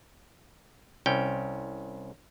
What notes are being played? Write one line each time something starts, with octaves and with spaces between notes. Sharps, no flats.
C2 C#4 G5